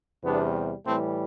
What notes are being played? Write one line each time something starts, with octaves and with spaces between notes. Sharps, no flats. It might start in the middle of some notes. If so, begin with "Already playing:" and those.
E2 C3 G3 B3 D4
A2 E3 G3 A3 C4